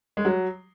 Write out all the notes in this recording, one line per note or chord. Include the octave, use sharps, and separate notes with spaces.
G#3
F#3